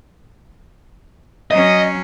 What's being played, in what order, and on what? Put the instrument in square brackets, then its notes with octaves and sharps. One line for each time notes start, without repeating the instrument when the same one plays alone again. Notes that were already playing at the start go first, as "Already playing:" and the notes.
[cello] F#3 C#4 [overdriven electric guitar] D#5